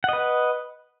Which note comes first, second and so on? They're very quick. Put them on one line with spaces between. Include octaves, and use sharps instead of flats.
F#5 D#5 B4